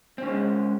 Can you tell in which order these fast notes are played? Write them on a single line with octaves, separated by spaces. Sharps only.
C4 C#4 G#3